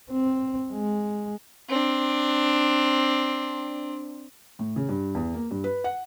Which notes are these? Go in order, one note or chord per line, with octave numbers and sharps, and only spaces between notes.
C4
G#3
C4 D4
A2
C#3
G2
E2
A#3
G2
B4
F#5